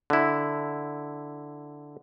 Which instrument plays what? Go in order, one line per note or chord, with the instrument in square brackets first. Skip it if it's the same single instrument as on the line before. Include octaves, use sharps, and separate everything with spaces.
[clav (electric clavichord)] D3 E4